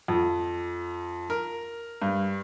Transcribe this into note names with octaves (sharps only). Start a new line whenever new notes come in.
F2
A#4
G2